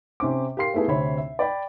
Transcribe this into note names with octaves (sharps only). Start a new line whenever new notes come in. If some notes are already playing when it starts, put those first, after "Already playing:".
C3 C#4 C5 D6
G4 A#4 F5 C6 C7
A3 B3 E4 G#4 A4
D2 C3 C4 C#5 E5 B5
E5
D5 G5 B5